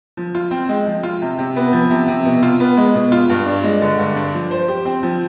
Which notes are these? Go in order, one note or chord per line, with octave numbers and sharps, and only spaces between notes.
F3
F4
C4
G#3
F3
F4
C3
C3
B3
F3
C3
C3
B2
F4
B3
G#3
B2
F4
G2
D4
G#3
D3
G2
D4
F3
C5
G4
C4
F3